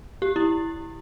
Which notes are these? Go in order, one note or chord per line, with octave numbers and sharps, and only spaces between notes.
G4
E4